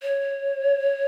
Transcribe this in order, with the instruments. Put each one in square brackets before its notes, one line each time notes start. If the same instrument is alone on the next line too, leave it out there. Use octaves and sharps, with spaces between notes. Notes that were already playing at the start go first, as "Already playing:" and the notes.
[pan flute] C#5